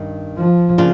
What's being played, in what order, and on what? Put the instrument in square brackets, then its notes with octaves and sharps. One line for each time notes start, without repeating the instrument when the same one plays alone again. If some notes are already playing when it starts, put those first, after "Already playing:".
Already playing: [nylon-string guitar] G2 D#3 C#4
[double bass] F3
[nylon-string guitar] C#3 A#3 D4 F4